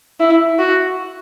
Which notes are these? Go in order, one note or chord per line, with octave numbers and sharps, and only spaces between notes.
E4
F#4